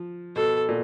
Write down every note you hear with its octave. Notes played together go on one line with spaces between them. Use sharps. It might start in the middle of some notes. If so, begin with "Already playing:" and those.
Already playing: F3
B2 A4
A#2